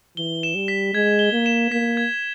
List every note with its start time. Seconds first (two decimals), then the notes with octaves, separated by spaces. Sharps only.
0.17 E3 G7
0.43 E7
0.55 G3
0.68 B6
0.94 G#3 G#6
1.19 G7
1.33 A#3
1.46 E7
1.71 A#3 B6
1.97 G#6